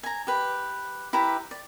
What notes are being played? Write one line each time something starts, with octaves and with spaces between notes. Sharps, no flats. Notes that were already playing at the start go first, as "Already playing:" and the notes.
G#5 A#5
G4 B4
E4 G4 B4 A#5
D5